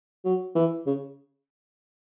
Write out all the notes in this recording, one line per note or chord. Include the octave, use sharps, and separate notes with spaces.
F#3
E3
C#3